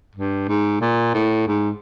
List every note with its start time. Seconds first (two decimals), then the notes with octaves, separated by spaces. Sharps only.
0.15 G2
0.49 G#2
0.81 A#2
1.14 A2
1.47 G#2